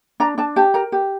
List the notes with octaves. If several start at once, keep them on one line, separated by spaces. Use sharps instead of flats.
D4 A#5
D4 A5
G4 A5
A#4 A#5
G4